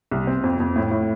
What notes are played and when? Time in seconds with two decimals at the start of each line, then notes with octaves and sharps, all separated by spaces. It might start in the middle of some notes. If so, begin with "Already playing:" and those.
0.11 C2
0.27 C4
0.44 F2
0.60 F2
0.76 A2
0.91 A2